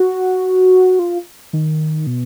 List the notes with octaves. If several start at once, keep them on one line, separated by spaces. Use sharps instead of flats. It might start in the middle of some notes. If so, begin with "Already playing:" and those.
Already playing: F#4
F4
D#3
B2